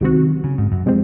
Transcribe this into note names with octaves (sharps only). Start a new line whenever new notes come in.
C#2 C3 D#3 F#3 C4 F#4
C#3
G#2
F#2
C3 F3 G#3 C4